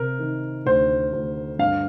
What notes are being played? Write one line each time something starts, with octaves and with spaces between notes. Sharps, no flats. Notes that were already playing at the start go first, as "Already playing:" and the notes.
Already playing: C3 A#4
D#3
D2 C5
D2
G2 F5